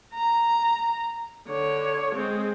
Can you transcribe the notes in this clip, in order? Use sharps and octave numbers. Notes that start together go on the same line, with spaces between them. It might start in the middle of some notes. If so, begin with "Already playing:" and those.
A#5
D3 C#5
G#3 C4